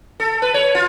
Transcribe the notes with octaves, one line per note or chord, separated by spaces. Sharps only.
A4
B4
C#5
F4